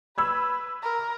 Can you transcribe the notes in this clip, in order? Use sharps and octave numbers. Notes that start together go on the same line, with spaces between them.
B4 B5 E6 G#6
A#4